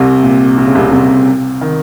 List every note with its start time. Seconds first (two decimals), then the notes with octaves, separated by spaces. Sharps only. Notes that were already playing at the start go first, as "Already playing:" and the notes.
Already playing: C2 C3
0.23 A#2
0.58 C3
0.66 C#3
0.75 C2 C3
0.92 C2 C3
1.61 D#3